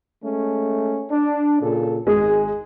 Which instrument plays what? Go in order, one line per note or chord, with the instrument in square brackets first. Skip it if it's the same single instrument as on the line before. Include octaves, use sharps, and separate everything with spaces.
[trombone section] G#3 A3 C#4
D4
A#2 C#3 A4
[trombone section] G#1 G#4 [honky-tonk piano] G#3